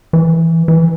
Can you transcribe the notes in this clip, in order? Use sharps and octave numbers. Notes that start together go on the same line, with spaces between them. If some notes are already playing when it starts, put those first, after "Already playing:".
E3
E3